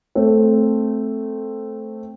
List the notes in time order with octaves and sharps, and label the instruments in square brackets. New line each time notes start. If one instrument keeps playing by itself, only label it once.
[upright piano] A3 C4